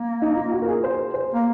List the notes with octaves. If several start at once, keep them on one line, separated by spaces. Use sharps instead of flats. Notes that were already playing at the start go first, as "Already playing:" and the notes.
Already playing: A#3
D#4
F4
F#4
A#4
G#4
C5
C5
A#3